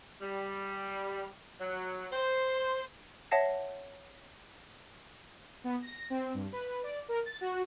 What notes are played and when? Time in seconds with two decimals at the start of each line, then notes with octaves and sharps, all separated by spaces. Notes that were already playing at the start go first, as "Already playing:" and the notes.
0.21 G3
1.61 F#3
2.12 C5
3.31 C#5 E5 F#5 A5 A#6 C7
5.64 B3
5.82 A#6
6.10 C4
6.34 G2
6.53 B4
6.83 D5
7.09 A#4
7.26 A6
7.41 F#4